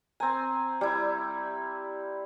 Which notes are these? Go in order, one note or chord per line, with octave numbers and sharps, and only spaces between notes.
C4 G#5 A#5
G3 E4